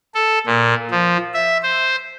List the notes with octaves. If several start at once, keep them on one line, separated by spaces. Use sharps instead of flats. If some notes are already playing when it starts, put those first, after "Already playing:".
A4
A#2
F3
E5
C5